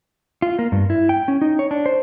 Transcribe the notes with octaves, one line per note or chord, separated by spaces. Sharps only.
F4
A#3
G2
E4
G5
C#4
D#4
C#5
D4
C5